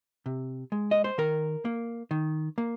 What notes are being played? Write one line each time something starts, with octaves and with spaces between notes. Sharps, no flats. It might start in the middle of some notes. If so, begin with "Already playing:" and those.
C3
G#3
D#5
C5
D#3 A#4
A#3
D#3
A#3